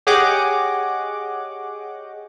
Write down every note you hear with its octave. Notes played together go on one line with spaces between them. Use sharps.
G4 G#4 C#5 D#5 F#5 D6